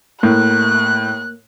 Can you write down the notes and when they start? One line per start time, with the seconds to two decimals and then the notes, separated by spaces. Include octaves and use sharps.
0.23 A2 A#3 F#6